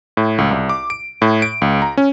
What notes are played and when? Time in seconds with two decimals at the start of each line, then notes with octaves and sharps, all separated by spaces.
0.17 A2
0.38 C#2
0.51 C2
0.69 D6
0.90 D7
1.22 A2
1.42 D7
1.62 C#2
1.82 A#5
1.97 C#4